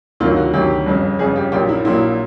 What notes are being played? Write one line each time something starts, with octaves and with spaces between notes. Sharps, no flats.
D2 C3 D#3 F#3 F4
F#4
D2 C3 D#3 F#3 G4
G1 F2 C#3
G1 F2 C#3 G#4
G4
A#1 A#2 F#3 A#3 G4
E4
A#1 A#2 F#3 A#3 E4